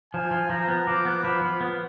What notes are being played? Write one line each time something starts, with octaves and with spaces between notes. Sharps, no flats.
F3 G#5
F3
F3 A#5
B3
F3 D6
B3
F3 B5
F3
B3